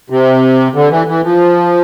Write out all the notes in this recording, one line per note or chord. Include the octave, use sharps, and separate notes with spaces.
C3
D3
E3
E3
F3